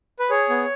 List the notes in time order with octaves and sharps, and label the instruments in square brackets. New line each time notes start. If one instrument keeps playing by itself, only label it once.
[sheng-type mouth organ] B4
G#4 C#5
B3